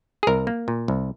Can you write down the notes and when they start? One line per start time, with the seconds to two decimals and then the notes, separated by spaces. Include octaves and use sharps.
0.23 G#4
0.27 C2 A#4
0.47 A#3
0.68 A#2
0.88 C2